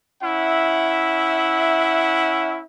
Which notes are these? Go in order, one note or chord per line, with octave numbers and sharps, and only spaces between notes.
C#4 E4 E5 F#5